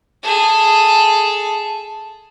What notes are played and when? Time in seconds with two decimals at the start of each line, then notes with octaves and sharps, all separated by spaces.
0.23 G#4 A4